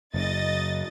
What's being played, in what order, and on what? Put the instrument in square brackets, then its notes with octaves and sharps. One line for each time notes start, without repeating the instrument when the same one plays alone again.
[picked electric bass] F#1 [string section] D#5 A6